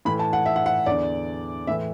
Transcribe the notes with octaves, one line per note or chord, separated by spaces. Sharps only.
A2 E3 B5
A5
F#5
E5
F#5
F#5
E2 D3 D5
A2 E3 E5